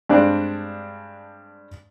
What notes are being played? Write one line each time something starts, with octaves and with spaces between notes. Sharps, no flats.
G2 G#3 C4 D4 D5 F#6